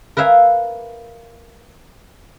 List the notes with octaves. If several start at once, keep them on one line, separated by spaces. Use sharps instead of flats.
A#4 B4 E5 F5 G#5